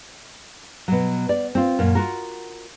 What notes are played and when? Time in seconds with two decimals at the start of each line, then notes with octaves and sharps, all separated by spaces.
0.88 B2 F#3
1.29 D5
1.55 C4 F4
1.79 F#2 A#2
1.95 F4 F#4 A#4